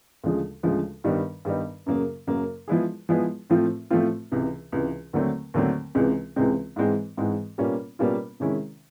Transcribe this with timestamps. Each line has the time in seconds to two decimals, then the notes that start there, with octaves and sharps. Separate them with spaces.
0.24 D2 C#3 F3 G#3
0.63 D2 C#3 F3 G#3
1.04 G2 D#3 G3 B3 D#4
1.45 G2 D#3 G3 B3 D#4
1.86 F#2 C#3 F#3 A#3
2.27 F#2 C#3 F#3 A#3
2.68 F3 G#3 B3 E4 G#4
3.09 F3 G#3 B3 E4 G#4
3.50 A2 F3 A3 C4 F4
3.90 A2 F3 A3 C4 F4
4.32 C#2 C3 E3
4.72 C#2 C3 E3
5.13 D#2 D3 F#3 A3 C4
5.54 D#2 D3 F#3 A3 C4
5.95 C#2 C3 E3 G#3 C4
6.36 C#2 C3 E3 G#3 C4
6.76 G#2 E3 G#3 C4
7.17 G#2 E3 G#3 C4
7.58 B2 G3 A#3 C#4 F4
7.99 B2 G3 A#3 C#4 F4
8.40 C3 D#3 G#3 C#4 E4